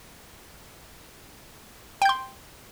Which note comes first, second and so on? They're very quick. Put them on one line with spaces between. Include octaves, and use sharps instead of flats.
G5 G6 C6